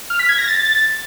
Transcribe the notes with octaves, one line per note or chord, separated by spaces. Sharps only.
F6
B6
G#6
A#6
A6